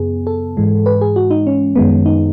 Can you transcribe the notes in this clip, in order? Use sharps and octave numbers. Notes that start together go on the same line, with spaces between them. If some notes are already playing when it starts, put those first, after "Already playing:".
Already playing: F#2 C#3 B3 G#4
A4
G#2 E3 G#3
B4
G#4
F#4
D#4
C#4
F#2 D#3 G#3 B3
D#4